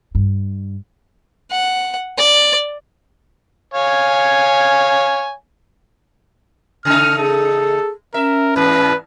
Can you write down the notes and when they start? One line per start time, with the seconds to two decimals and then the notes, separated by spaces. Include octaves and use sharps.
0.15 G2
1.51 F#5
2.18 D5
3.74 C#5 F5 G#5
6.85 C#3 A3 D#4 F6
7.18 G#4 A4
8.14 C#4 A#4 E5
8.56 E2 G#2 B4